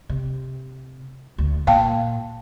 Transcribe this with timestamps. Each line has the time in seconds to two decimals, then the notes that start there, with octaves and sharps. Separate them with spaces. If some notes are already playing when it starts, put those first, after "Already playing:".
0.09 C3
1.38 D2
1.67 A#2 F5 G5 A5